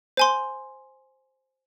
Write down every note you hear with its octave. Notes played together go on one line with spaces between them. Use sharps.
C5 G#5 C6